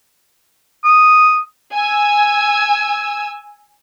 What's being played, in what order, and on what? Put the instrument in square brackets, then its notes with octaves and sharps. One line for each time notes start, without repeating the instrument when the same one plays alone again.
[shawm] D#6
[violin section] G#5 E6